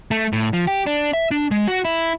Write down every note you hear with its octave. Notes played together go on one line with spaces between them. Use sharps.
A3
A2
F3
G4
D4
E5
D4
G#3
F#4
E4